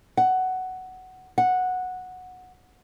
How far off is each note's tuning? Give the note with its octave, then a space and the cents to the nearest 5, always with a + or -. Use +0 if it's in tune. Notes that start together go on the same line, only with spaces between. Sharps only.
F#5 +10
F#5 -10